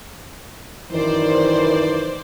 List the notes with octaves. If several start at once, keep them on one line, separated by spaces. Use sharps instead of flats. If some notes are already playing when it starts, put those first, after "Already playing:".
F#2 D#3 E3 C5 D5